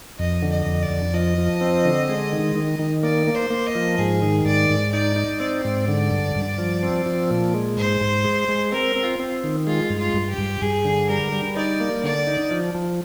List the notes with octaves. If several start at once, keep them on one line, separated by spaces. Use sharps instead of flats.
F2 D#5
D3
D#5
F2
D5
F2
F3 D#5
F3
C4
D3
G#3
D#3
D#3
D#3
A#3 D5
A#3
C5
A#3
D#5
F3
G#2 G#4
D#3
G#2 D5
G#2
D#4 D5
D#4
C4 D5
G#2
D3
G2
G2
F3
C4
F3
A#2
G#3
G#2 C5
G#2
G#3
G#3
C4 A#4
C4
F4
C4
D#3
G#3 F4
G2
F4
G2
G4
G2
G2 G#4
D3
G3 A#4
G3
D#4 D5
A#3
D3 D5
D#4
F3
F3